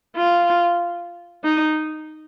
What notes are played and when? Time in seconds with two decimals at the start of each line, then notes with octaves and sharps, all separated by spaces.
0.17 F4
1.43 D#4